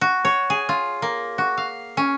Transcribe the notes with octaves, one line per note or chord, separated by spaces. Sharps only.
F#4
C#5
G#4
F4
A#3
F#4
F5
C#4